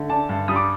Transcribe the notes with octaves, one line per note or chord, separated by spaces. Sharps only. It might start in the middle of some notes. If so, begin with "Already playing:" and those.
Already playing: D3 A3
D4 A5
G2
G3 D#6
D6